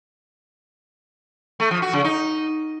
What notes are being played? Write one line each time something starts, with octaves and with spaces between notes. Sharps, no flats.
A3
F3
F#4
C#3
D#4